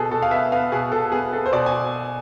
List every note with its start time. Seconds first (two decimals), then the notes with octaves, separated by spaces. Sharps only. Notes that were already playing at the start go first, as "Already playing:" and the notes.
Already playing: B2 B3 G#4 A4
0.11 B2 A4
0.22 F5
0.31 B3 E5
0.52 B3 F5
0.72 B2 G#4
0.92 B2 A4
1.12 B3 G#4
1.33 B3 A4
1.46 C5
1.52 B2 D5
1.66 G#5